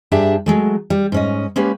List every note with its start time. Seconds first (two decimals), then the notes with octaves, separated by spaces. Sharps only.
0.12 G2 D4 G4 G#4 E5 A5
0.46 F#3 G#3 A3
0.90 G3
1.12 G#2 C#4 D#5
1.56 G#3 A#3 C#4 G4 B4